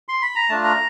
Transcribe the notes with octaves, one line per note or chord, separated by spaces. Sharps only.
C6
B5
A#5
A3 D4 F4 A5
A#5